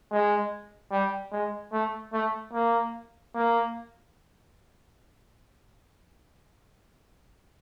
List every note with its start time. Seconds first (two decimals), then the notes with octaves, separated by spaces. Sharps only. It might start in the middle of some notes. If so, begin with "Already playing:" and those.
0.11 G#3
0.91 G3
1.32 G#3
1.72 A3
2.13 A3
2.53 A#3
3.35 A#3